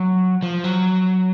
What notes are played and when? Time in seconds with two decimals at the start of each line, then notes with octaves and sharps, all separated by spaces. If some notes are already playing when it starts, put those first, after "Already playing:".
Already playing: F#3
0.43 F3
0.64 F#3